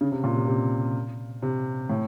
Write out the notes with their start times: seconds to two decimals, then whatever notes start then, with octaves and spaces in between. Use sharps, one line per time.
0.01 C#3
0.12 C3
0.24 A#2
0.36 C3
0.47 C3
1.43 C3
1.90 A2